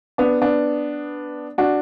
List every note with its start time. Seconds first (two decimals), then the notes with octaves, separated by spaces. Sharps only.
0.18 B3 D4
0.41 B3 D4
1.58 D4 F#4